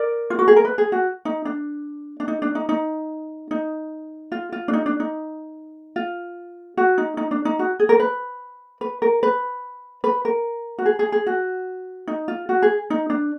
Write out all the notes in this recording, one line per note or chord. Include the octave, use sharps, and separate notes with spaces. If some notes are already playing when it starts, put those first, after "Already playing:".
Already playing: A#4 D5
F4
F#4
G#4
A#4
B4
G#4
F#4
D#4
D4
D4
D#4
D4
D#4
D#4
D#4
F4
F4
D4
D#4
D4
D#4
F4
F#4
D#4
D#4
D4
D#4
F#4
G#4
A#4
B4
B4
A#4
B4
B4
A#4
F#4
G#4
G#4
G#4
F#4
D#4
F4
F#4
G#4
D#4
D4